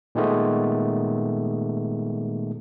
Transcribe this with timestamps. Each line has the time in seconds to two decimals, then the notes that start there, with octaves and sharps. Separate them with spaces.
0.15 A#2 D#3 G#3 A3 B3